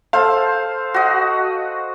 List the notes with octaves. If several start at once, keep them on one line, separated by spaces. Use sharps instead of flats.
A4 C5 F5
F#4 D#5